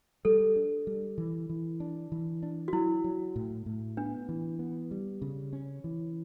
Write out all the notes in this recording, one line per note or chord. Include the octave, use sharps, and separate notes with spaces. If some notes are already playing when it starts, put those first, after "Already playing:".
G3 A4
D4
G3
E3
E3
D4
E3
D4
F#4
F#3 E4
F#3
A2
A2
B3 D4
E3
B3
G3
C#3
C#4
E3